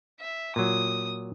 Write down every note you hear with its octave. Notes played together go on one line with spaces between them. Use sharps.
E5
A#2 F#3 D#6